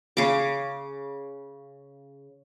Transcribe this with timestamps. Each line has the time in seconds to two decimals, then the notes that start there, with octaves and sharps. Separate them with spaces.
0.17 C#3 D6